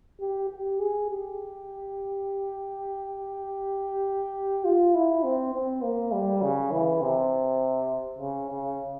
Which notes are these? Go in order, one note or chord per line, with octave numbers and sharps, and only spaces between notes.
G4
G4
G#4
G4
F4
E4
C4
C4
A#3
G3
C#3
E3
C3
C#3
C#3